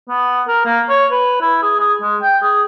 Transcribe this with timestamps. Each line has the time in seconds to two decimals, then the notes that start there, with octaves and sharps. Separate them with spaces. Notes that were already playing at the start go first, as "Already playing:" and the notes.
0.09 B3
0.48 A#4
0.65 A#3
0.89 C#5
1.11 B4
1.42 E4
1.63 G#4
1.79 G#4
2.02 G#3
2.22 G5
2.43 G#4